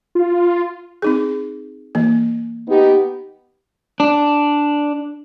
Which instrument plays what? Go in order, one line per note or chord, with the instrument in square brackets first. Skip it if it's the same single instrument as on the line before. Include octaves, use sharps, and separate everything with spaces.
[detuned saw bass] F4
[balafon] C4 D#4 G#4
E3 A#3
[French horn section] B3 D#4 G4
[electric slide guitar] D4